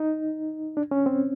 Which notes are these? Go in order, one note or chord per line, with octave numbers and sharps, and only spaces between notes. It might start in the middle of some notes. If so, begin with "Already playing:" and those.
Already playing: D#4
D4
C#4
C4